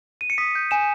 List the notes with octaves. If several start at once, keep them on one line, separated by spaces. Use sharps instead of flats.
D#7
C#7
D#6 B6
G6
G#5 E7